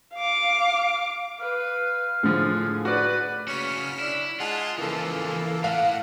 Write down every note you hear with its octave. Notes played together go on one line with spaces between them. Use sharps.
F5 D6
B4 F5
A2 D3 F3 G#4
F#4 B4 D5
C#3 C#4 F#4 F6 B6
D4 E4
G#3 F4 F#5 G#5 A5
C#3 E3 F3 A#3 A4
A2 F5 F#5